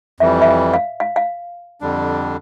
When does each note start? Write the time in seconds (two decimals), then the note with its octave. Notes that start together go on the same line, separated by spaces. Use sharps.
0.20 F2 E3 G3 E5
0.42 E5
0.47 F5
0.74 F5
1.00 F5
1.16 F5
1.81 F2 D3 G3 D4